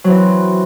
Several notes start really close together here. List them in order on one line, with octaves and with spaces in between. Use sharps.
F#3 C4 E3